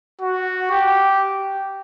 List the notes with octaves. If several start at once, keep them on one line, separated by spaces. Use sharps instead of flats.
F#4
G4